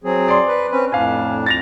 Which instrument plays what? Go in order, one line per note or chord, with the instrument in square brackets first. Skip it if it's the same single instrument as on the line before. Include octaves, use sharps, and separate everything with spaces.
[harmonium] F#3 C4 G#4
[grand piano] D5 C6 D6
[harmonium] B4
C4 C#4 B4
[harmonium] F2 A2 D4 [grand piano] F5 G#5
[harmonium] F2 [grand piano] A6 A#6 F7